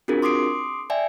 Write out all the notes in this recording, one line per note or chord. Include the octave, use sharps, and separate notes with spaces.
C4 D4 F4 F#4 G#4 A#4
C6 D6 D#6 C7 D7
D5 E5 G5 G#5